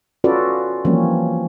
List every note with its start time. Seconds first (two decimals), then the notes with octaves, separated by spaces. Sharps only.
0.24 C#4 F4 F#4 A4 B4 D5
0.85 E3 F3 G3 A#3 C4 C#4